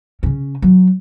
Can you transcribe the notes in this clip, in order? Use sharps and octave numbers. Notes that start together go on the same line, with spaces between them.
C#3 C#4
F#3